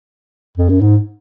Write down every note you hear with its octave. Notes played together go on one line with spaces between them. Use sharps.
F2
F#2
G#2